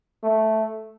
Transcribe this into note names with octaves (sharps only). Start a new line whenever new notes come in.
A3